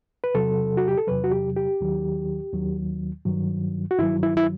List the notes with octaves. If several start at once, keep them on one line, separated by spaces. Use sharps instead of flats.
B4
E2 C3 F#3 A4
F#4
G4
A4
E2 C3 F#3 B4
F#4
G4
G4
D#2 D#3 F#3
D#2 D#3 F#3
G2 D#3 F#3
F#4
G2 D#3 F#3 E4
E4
E4